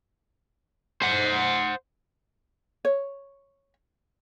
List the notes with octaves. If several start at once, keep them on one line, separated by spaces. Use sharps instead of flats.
C5 F#5
C#5